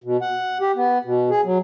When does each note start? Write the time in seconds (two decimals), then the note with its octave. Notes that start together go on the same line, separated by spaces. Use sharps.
0.04 B2
0.22 F#5
0.61 G4
0.76 B3
1.05 B2
1.30 G#4
1.45 F#3